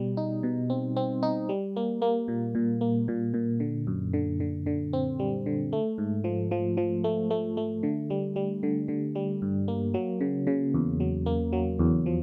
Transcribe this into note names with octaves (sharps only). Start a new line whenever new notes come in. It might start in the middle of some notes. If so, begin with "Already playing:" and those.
Already playing: B2 G3
D#4
B2
C4
C4
D#4
G3
A#3
A#3
A#2
A#2
A#3
A#2
A#2
D3
F#2
D3
D3
D3
C4
G3
D3
A3
G#2
F3
F3
F3
A3
A3
A3
D3
G3
G3
D3
D3
G3
G2
A#3
F#3
C#3
C#3
E2
F#3
A#3
F#3
E2
F3